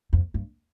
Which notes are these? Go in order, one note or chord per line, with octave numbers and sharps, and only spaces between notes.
F2
G2